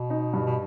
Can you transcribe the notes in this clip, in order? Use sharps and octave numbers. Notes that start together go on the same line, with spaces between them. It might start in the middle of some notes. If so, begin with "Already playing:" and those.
Already playing: B2
D#4
G2
B2